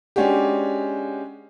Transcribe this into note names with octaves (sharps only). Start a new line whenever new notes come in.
G#3 C#4 D4 F#4 G4